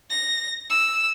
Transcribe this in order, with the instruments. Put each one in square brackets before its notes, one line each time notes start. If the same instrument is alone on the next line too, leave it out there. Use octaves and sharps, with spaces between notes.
[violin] A#6
E6